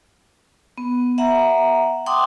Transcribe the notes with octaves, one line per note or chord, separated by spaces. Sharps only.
B3
E5 F#5 A#5
F#5 G5 C6 D6 D#6